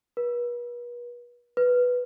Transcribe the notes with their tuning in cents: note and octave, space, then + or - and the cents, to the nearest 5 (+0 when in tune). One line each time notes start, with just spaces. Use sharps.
B4 -40
B4 +0